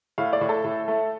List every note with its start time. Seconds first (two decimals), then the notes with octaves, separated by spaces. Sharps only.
0.18 A2 F5
0.33 D5
0.41 A2
0.49 A4
0.64 A2
0.88 A3